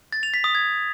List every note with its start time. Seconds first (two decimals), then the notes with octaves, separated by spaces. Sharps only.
0.13 A6
0.23 F7
0.34 B6
0.44 D#6
0.55 G#6